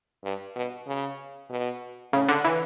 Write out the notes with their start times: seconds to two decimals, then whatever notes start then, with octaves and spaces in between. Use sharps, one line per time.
0.24 G2
0.56 B2
0.87 C#3
1.50 B2
2.13 A2 C#3
2.28 D3
2.45 E3